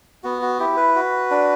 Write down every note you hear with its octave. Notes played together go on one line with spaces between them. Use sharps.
B3 F#4
F#4
E4 G4
B4
F#4
D4